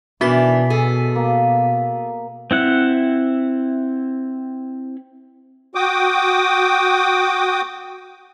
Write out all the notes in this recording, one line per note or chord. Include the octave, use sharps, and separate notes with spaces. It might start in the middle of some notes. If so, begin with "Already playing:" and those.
B2 D#3 E3 B3 D4 F#4 B6
G#4 A4
A#3
C4 E4 F#5
F#4 G5 D6 D#6